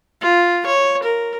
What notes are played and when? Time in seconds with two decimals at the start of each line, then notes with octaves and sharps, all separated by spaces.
0.21 F4
0.66 C#5
1.03 A#4